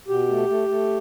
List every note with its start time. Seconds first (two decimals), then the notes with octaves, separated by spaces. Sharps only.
0.08 B2 G4
0.28 A3
0.48 A3
0.68 A3